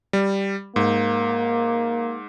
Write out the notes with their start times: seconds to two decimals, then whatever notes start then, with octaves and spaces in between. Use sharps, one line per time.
0.13 G3
0.76 G#2 A#3